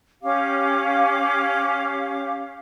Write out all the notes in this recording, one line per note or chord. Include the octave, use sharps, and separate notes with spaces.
C#4 G4 F5 D6